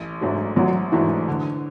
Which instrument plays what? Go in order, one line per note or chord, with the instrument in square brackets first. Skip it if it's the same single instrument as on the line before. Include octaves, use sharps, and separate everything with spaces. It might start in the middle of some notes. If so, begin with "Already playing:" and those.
Already playing: [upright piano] A1
G#2 F#3 A3 D4
[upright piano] A1 [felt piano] F#3
[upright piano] G#2 F#3 A3 D4 [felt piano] E3
[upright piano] D3